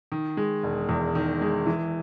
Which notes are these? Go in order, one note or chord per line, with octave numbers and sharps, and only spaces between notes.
D#3
G#3
E1
E2
D#3
G#3
E3